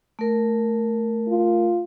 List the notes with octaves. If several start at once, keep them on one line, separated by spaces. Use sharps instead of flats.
A3 A#4
F4